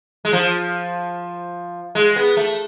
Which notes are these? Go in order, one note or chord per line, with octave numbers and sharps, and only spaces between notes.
G#3
F3
G#3
B3
A3